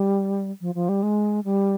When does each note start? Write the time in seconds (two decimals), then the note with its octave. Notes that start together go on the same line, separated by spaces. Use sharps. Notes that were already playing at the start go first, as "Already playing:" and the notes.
Already playing: G3
0.61 F3
0.75 F3
0.89 G3
1.03 G#3
1.44 G3